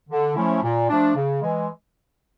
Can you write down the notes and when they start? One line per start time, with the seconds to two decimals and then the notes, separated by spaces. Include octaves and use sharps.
0.09 D3
0.36 F3 A3 C#4 E4
0.63 A#2
0.90 F3 A3 D4
1.16 C#3
1.42 E3 G#3